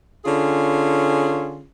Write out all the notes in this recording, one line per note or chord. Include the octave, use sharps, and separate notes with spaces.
D3 C#4 F4 G#4